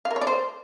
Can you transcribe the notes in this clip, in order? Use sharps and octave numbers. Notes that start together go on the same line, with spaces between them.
F5
A#4
C#5
D5
C5